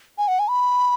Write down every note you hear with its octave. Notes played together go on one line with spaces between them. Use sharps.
G#5
F#5
G#5
B5